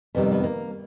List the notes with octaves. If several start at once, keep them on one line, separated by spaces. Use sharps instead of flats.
F2 C3 D#3 G3 B3
B3
A#3